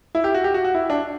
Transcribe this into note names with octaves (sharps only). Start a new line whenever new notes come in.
E4
G4
F#4
G4
F#4
F#4
E4
D4